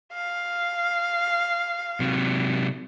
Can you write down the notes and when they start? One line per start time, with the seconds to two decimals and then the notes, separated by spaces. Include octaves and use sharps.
0.14 F5
2.00 C3 F#3